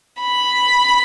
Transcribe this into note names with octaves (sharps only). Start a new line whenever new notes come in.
B5